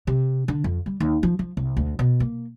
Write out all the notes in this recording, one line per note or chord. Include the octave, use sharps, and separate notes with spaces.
C3
D3
F2
G3
D#2
F3
F3
C2
D2
B2
A#3